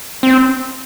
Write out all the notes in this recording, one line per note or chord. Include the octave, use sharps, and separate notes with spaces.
C4